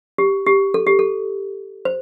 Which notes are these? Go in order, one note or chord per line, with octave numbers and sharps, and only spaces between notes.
G4
G4
A4
G4
A4
C5